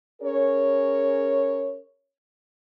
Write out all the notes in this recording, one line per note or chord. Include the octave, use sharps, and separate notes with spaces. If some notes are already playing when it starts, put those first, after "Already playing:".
C#4 G#4 A#4 C#5